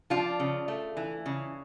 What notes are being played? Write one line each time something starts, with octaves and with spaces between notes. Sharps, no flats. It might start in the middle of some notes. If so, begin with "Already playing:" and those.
F3 D4 F4
C#3
A3
E3
C#3